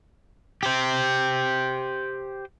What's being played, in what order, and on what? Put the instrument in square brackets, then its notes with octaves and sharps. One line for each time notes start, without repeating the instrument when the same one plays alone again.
[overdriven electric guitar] G4 C5